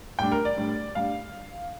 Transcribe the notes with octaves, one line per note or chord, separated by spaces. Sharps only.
A2 G3 D4 G5
A#4
D5
A2 G3 D4
A2 G3 D4 F5